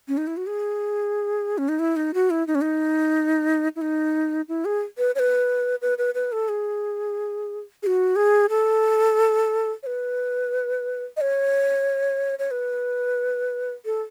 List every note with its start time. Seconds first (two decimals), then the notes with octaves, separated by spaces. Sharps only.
0.08 C#4
0.17 D#4
0.27 E4
0.37 F#4
0.47 G#4
1.58 C#4
1.69 D#4
1.79 E4
1.96 D#4
2.14 F#4
2.30 E4
2.47 D#4
2.55 C#4
2.61 D#4
3.76 E4
3.81 D#4
4.48 E4
4.65 G#4
4.98 B4
5.15 C#5
5.19 B4
5.82 B4
5.98 B4
6.15 B4
6.32 A4
6.49 G#4
7.83 G#4
7.87 F#4
8.16 G#4
8.50 A4
9.83 C#5
9.86 B4
11.17 D#5
11.21 C#5
12.39 C#5
12.51 B4
13.85 A4